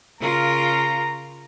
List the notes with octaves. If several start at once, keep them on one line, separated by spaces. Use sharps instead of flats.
C#3 F4 A#4 A#5